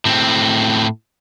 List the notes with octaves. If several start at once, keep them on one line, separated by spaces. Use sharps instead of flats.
A2 C4